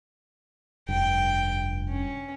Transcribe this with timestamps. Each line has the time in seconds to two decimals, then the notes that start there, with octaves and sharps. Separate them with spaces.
0.89 F1 G2 G5
1.90 C#4